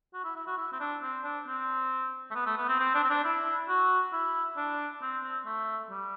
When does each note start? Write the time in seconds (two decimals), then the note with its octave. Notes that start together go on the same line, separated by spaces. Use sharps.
0.14 F#4
0.24 E4
0.36 E4
0.47 F#4
0.58 E4
0.73 C4
0.80 D4
1.03 C4
1.24 D4
1.47 C4
2.31 A3
2.35 B3
2.46 A3
2.58 B3
2.69 C4
2.80 C4
2.95 D4
3.04 C4
3.10 D4
3.25 E4
3.69 F#4
4.13 E4
4.57 D4
5.02 C4
5.24 C4
5.46 A3
5.91 G3